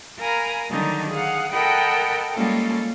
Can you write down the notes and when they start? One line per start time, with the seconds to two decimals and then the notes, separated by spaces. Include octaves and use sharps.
0.19 A#4 F5 G#5 A#5 B5
0.70 D3 D#3 F#3 G3 D#4
1.10 G#4 F5 F#5
1.52 A4 A#4 D#5 F#5 G5 B5
2.33 G3 G#3 A#3 C#4 F4 A4